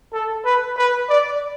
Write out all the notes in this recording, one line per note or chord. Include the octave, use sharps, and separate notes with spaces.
A4
B4
B4
D5